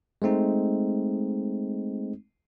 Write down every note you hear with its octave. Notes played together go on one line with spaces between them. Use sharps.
G#3 A3 C4 D#4